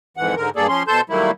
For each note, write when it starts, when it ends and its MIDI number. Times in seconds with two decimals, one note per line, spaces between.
0.17 0.35 41
0.17 0.35 44
0.17 0.35 52
0.17 0.35 78
0.36 0.50 44
0.36 0.50 50
0.36 0.50 70
0.56 0.67 43
0.56 0.67 58
0.56 0.67 68
0.56 0.67 69
0.56 0.67 74
0.68 0.83 53
0.68 0.83 61
0.68 0.83 84
0.88 1.01 47
0.88 1.01 69
0.88 1.01 72
0.88 1.01 81
0.88 1.01 84
0.88 1.01 91
1.10 1.31 51
1.10 1.31 54
1.10 1.31 55
1.10 1.31 57
1.10 1.31 58
1.10 1.31 64